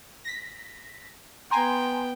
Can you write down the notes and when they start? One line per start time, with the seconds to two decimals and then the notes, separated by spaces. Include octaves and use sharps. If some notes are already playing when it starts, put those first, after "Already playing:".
0.25 A#6 B6
1.51 B3 G5 G#5 A#5 C6